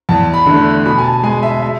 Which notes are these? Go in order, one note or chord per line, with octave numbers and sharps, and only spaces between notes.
E2 A5
B5
D3 A3
B2 B5
G#5
A5
G#3 G#5
E5
E5